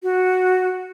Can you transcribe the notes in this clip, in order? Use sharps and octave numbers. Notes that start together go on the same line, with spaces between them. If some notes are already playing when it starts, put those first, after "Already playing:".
F#4